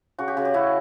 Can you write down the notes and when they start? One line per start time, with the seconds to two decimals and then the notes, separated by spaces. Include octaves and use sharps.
0.18 C#3 F#4
0.28 G4
0.37 C#3 F#4
0.45 G4
0.54 C#3 E4 F#4